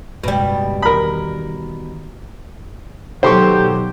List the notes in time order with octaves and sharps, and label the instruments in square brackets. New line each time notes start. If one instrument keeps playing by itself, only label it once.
[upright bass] F#1 G#2 [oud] B2 G3
[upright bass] E2 D#3 [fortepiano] A#4 B5
[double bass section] B2 F#3 [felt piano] D#3 A4 [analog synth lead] G4 [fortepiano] C5 C6 C#6